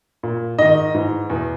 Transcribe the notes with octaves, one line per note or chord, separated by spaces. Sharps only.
A#2
G#2 D#3 D#5
G#2 E3
E2 B2